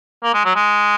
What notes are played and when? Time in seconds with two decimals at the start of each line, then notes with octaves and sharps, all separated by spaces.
0.23 A#3
0.34 G#3
0.45 F#3
0.55 G#3